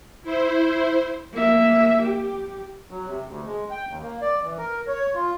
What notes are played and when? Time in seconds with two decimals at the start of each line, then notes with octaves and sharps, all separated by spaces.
0.23 E4 C5
1.33 A#3 E5
2.03 G4
2.91 F#3
3.07 C3
3.27 D2
3.45 G#3
3.71 G5
3.88 D#2
4.02 A#3
4.22 D5
4.43 E3
4.58 A#4
4.88 C#5
5.15 F4